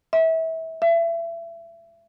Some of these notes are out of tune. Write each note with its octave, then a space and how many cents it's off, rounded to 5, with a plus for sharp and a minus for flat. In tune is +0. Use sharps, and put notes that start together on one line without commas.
E5 -25
E5 +30